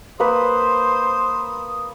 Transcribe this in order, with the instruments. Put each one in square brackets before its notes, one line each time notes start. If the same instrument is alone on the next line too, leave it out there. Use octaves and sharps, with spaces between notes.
[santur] A#3 B4 [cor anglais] C5 [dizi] D#6